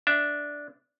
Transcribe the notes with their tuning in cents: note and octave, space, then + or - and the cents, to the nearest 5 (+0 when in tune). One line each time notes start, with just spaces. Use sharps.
D4 -5 E5 +0